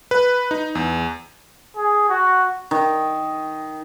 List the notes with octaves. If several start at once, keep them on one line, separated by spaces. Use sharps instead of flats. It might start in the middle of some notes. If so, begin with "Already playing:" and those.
B4
D#4
E2
G#4
F#4
D#3